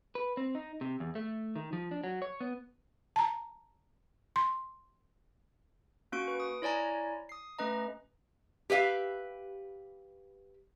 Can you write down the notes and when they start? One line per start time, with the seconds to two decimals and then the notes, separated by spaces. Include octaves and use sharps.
0.15 B4
0.37 C4
0.55 D#4
0.81 C3
1.00 E2
1.15 A3
1.56 D#3
1.73 F3
1.91 D4
2.04 F#3
2.22 C#5
2.41 B3
3.16 A5 A#5
4.36 C6
6.12 A#3 C#4 F#4 C#6 D7
6.28 B4 D7
6.40 D#6
6.62 E4 C#5 D5 G#5 A#5
7.29 D#6 C7
7.59 A3 C#4 B4 D#5 A#5
8.70 G4 B4 E5 F5